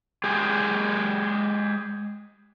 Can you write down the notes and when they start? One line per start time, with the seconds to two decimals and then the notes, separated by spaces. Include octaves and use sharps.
0.24 G#3 G4 G#4